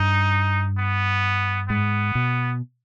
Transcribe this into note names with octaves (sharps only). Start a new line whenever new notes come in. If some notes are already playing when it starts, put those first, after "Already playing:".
Already playing: G2 D#4
B3
G#2 B3
B2